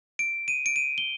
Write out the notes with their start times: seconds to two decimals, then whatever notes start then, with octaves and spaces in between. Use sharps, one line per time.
0.19 D7
0.48 D#7
0.66 D7
0.76 D#7
0.98 G7